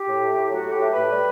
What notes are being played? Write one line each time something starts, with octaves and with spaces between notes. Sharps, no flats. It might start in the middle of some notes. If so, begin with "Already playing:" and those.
Already playing: G4
A2
A3
A2
F#3 F#4
A2 G4
A3
B4
A2
G3